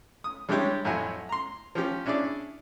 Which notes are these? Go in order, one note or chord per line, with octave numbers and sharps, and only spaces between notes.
D#6
G3 G#3 D4 E4 G4 C#5
F2 A2 F#3 E4 G#5
A#5 C6
F3 C#4 G4
C#4 D4 E4 G#4 D5